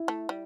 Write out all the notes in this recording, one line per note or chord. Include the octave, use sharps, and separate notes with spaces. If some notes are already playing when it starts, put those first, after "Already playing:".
Already playing: E4
A3
G3